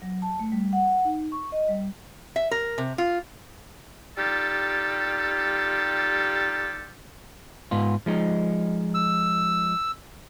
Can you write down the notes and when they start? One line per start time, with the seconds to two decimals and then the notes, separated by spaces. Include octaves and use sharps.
0.02 F#3
0.22 A5
0.40 A3
0.52 G3
0.73 F#5
1.05 D#4
1.32 C#6
1.52 D#5
1.68 G3
2.36 E5
2.51 A#4
2.78 C3
2.98 F4
4.18 G3 D#4 F4 G4 A4
7.71 G#2 B3 F4
8.06 F3 G#3 D#4
8.94 E6